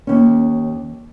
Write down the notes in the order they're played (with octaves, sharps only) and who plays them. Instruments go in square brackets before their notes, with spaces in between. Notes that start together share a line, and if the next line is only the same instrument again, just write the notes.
[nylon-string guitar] D#2 C#4